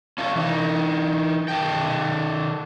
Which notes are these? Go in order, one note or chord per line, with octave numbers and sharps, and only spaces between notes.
C#4 F4 A4 C#5
E3 D#4
D#3 A4 G5